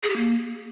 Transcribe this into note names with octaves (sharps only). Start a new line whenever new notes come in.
G#4
G4
A#3